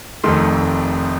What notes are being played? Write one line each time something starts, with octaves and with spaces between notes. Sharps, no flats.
F1 F2 D#3 A3 C6